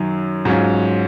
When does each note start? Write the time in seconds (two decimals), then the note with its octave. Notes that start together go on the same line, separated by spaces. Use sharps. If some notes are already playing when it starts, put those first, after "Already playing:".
Already playing: F#2 D#3 F#3
0.45 G#2 F#3 C#4 F4